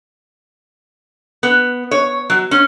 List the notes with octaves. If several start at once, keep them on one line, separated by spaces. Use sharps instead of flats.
B3
C#5
F#3
C#4